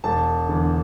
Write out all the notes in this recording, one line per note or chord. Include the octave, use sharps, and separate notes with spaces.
E1 A5
E2 D3